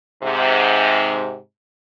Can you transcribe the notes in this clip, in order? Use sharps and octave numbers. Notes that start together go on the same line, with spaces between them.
G#2 C3